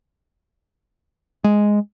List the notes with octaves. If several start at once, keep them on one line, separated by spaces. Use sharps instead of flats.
G#3